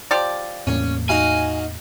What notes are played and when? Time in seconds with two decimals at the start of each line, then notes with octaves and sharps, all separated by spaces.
0.11 F3 G4 D5
0.67 E2 A2 A#3 C#4
1.09 D#4 F#4 F5 G#5